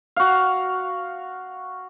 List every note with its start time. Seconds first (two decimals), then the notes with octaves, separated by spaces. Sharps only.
0.16 F#4 F5